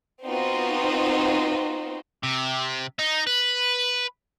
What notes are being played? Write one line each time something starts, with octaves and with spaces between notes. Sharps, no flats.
B3 C4 D#4 F4 F#4 C5
C3
D#4
B4